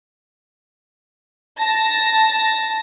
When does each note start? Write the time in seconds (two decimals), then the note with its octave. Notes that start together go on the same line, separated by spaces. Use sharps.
1.59 A5 A#6